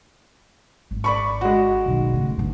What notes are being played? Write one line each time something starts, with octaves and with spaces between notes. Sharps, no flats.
G#1
D5 B5 C#6
G#3 F#4
B1 D#3
A2 C#3
G1 A2